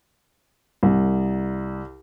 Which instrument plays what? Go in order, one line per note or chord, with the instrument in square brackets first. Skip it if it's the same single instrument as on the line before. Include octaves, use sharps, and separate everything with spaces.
[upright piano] C2